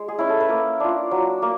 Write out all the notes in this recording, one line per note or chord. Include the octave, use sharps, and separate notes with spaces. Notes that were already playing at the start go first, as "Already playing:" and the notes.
Already playing: G#3
G#4
C#4 E4
A4
B4
A#3 A#4
D4 F4
F#3
A#3